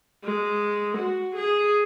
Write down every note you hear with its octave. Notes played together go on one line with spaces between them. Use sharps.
G#3
F#4
G#4